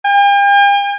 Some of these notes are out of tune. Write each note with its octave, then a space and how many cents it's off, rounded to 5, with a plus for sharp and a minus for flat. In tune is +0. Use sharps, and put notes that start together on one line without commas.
G5 +45